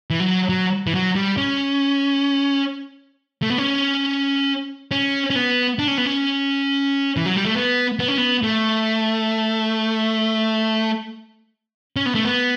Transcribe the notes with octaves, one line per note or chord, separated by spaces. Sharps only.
E3
F#3
F#3
E3
F#3
G3
C#4
A3
B3
C#4
C#4
C#4
B3
D4
C#4
B3
C#4
E3
F#3
G3
A3
B3
B3
C#4
B3
A3
C#4
B3
A3
B3